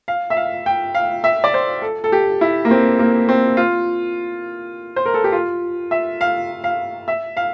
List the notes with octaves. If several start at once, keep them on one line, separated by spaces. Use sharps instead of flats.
F5
E5
F5
G5
F5
E5
D5
C5
A4
A4
G4
E4
A#3
C4
A#3
C4
F4
C5
A#4
A4
G4
F4
E5
F5
F5
E5
F5